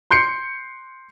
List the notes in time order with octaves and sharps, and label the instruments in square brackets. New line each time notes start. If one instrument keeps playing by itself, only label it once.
[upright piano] C6 G6 C7 C#7